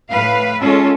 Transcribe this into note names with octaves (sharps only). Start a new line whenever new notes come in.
A2 B4 F5
G#3 C#4 F4 A4